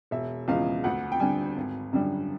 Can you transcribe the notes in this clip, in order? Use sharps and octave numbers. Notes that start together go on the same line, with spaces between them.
E1 E5
E2 C#3 F3 G#3 F5
D2 F#5
G5
D3 G3 G#5
G#1
F#2 D3 G3